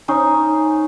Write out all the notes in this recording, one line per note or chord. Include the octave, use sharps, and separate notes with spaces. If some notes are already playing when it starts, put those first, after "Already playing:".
C#4 D#4 C5